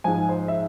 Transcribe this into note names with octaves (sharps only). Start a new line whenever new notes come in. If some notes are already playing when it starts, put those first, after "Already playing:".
G#2 F3 G#5
C5
E5